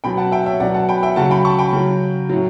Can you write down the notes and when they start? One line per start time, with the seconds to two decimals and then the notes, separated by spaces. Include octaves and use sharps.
0.04 B2 F#3 G5 B5
0.17 F#5 A5
0.32 E5 G5
0.46 C#5 E5
0.60 B2 F#3 D5 F#5
0.74 F#5 A5
0.89 G5 B5
1.03 E5 G5
1.16 C#3 F#3 F#5 A5
1.31 G5 B5
1.45 A5 C#6
1.59 G5 B5
1.73 C#3 F#3
2.29 A2 F#3